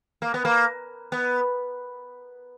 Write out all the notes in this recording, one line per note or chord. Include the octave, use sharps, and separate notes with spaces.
A#3
B3
A#3
B3